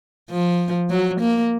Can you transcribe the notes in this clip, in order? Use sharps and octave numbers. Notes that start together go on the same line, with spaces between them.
F3
F#3
A#3